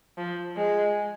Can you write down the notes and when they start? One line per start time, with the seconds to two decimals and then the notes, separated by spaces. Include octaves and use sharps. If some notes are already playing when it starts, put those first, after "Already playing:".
0.18 F3
0.57 G#3